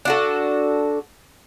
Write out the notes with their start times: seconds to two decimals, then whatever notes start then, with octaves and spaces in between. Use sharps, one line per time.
0.05 D4 F#4 A4